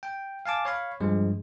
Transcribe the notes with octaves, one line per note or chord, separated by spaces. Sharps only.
G5
F5 G#5 A5 D6
C#5 F5 B5
G2 F3 G#3